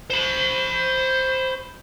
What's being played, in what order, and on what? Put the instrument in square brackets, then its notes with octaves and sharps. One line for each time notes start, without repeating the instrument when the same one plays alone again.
[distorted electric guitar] C5 B5